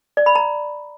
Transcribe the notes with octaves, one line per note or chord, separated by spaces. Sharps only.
D5
B5
A#5